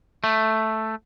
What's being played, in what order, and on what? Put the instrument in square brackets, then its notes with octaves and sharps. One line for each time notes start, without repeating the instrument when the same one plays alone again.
[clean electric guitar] A3